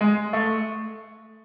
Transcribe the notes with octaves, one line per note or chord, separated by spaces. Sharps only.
G#3
A3